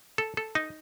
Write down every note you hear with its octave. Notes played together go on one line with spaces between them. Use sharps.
A4
A4
D#4